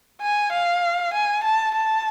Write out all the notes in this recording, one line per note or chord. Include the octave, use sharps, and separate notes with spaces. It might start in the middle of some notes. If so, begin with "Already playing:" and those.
G#5
F5
G#5
A5
A5